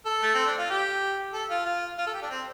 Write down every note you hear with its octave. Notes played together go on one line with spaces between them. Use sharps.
A4
A3
C4
D4
F4
G4
A4
F4
F4
F4
A4
G4
D4
C4